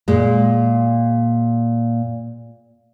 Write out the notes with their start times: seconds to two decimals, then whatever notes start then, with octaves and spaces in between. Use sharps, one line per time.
0.08 A#2 G#3